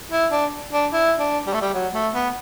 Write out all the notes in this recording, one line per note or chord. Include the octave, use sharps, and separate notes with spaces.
E4
D4
D4
E4
D4
G3
A3
G3
F#3
A3
B3